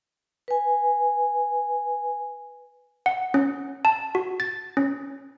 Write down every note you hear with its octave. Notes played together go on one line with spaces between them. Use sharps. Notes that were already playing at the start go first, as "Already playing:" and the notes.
B4 G#5
F#5
C#4
A5
F#4
A6
C#4